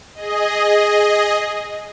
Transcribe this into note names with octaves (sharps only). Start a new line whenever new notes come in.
G#4 D#5